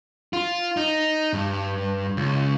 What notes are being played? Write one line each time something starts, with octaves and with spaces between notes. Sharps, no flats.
F4
D#4
G2
C#2